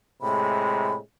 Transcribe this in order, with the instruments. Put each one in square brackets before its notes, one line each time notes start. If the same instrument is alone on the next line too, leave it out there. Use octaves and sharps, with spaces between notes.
[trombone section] A2 C3 G#3 [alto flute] B5